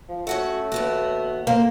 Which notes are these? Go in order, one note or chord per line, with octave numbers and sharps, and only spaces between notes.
F3
A3 C#4 F#4 F#5
D#2 B3 F#4
A#3 C5